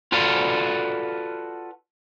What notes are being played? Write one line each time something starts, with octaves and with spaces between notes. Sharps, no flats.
F4 F#4 A4 B4 D5 F5